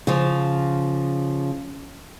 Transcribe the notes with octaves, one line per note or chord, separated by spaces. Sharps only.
C#3 F3